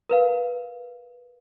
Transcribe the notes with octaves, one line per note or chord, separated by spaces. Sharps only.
A#4 B4 F5